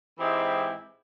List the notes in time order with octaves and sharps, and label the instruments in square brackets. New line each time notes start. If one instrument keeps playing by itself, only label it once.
[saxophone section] G#2 E3 G#3 C4 E4 G4